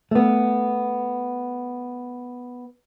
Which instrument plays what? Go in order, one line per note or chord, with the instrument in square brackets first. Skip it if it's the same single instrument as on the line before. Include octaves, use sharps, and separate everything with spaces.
[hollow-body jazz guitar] A3 B3